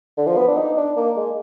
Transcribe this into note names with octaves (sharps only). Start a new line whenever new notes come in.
D3
F3
B3
D4
D#4
D4
A#3
G#3